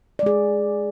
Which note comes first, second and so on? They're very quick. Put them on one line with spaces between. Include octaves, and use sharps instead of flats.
D5 G#3 G#4